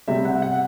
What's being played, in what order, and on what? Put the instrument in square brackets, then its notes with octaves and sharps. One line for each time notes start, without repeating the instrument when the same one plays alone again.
[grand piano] C3 G3 E5
F#5
F#5